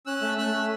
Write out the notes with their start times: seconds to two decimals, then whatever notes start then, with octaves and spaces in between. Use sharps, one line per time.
0.06 C#4 E6 F#6
0.22 A3
0.38 A3 E6 F#6
0.53 C#4